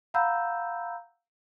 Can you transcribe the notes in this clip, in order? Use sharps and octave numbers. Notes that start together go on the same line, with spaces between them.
F5 F#5 A#5 B5 E6 G6